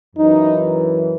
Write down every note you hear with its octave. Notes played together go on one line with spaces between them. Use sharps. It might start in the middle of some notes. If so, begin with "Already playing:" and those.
F#2 E3 D#4